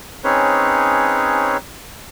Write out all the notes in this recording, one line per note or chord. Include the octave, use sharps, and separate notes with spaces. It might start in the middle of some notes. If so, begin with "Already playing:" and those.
C4 C#4 D#4 G#4 B4 C#5